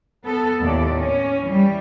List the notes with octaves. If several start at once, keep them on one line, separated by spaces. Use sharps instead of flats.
B3 A4
D#2 A2 A3 D5
C#4
E3 G3